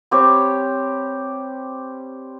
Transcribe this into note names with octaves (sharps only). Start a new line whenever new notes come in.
G3 C4 G4 C#5